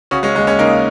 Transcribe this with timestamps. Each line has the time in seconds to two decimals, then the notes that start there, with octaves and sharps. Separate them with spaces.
0.11 C#3 C#4 F#4
0.23 G#3 C#4
0.35 D#2 G#3
0.47 G#3 C#4
0.59 C#3 A#3 D#4